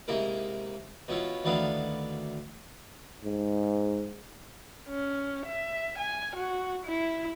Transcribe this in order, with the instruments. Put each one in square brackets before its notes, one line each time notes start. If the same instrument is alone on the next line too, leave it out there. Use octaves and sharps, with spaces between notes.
[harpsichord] G#2 C3 A#3 E4 A#4
B2 C#4 E4 F4
D2 D#3 B3 D4 E4 F5
[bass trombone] G#2
[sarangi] C#4
E5
G#5
F#4
E4